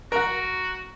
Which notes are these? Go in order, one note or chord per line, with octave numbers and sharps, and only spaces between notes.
F#4 A#4 F#5